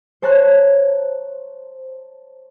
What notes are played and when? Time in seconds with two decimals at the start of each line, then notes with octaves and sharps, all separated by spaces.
0.22 C5 C#5 A5 A#5 C6 F#6